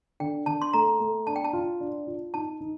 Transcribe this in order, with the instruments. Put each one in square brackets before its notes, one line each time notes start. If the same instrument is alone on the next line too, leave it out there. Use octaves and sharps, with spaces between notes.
[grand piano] D3 [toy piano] G5
[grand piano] D3 [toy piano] A5
[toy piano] C6
[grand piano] A3 [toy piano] A#5
[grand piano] A3
[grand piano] D4 [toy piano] A5
[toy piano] G5
A5
[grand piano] F4
D4
F4
[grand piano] D#4 [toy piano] A5
[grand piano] D#4